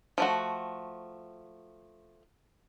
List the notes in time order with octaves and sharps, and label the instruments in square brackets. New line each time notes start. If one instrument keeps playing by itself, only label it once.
[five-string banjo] F3 A3 F#4